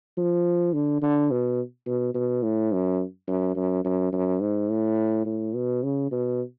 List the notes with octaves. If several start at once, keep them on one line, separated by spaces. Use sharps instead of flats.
F3
D3
D3
B2
B2
B2
A2
F#2
F#2
F#2
F#2
F#2
G#2
A2
A2
B2
C#3
B2